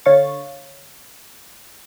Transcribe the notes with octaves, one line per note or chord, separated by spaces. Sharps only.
D3 C#5 F5 C#6 A6